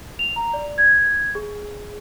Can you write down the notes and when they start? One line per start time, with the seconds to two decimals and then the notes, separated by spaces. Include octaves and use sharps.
0.19 F7
0.36 A#5
0.54 D5
0.78 G#6
1.35 G#4